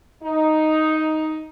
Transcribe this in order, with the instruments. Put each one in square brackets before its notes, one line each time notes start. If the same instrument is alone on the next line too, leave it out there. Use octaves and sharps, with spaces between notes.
[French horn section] D#4